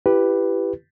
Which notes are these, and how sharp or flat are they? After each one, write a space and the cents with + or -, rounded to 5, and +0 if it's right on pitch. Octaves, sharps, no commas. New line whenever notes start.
E4 +25 G4 +0 B4 +0